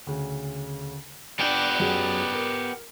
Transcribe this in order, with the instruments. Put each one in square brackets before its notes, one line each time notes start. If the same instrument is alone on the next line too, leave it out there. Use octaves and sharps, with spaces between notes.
[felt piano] D2 C#3
[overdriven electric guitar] B3 G4 [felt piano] D4 G5
[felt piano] F#2 F#4 G#4
A#4